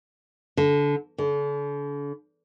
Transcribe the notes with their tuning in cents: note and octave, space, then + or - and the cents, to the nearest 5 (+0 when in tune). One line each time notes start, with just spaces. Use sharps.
D3 -20
D3 -40